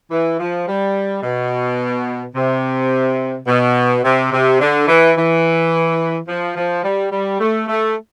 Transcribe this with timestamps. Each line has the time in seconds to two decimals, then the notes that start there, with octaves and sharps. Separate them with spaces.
0.11 E3
0.39 F3
0.67 G3
1.23 B2
2.35 C3
3.48 B2
4.04 C3
4.32 C3
4.60 D3
4.88 E3
5.16 E3
6.28 F3
6.57 F3
6.84 G3
7.12 G3
7.40 A3
7.68 A3